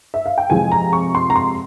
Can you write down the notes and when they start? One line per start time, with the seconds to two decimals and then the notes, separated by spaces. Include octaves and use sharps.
0.14 E5
0.26 F5
0.38 G5
0.50 F2 C3 F3 G#3 G#5
0.72 A#5
0.93 C#6
1.15 C6
1.30 A#5
1.36 C6